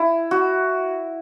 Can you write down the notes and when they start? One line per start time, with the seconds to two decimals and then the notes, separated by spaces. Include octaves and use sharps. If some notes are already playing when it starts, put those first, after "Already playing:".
Already playing: E4
0.31 F#4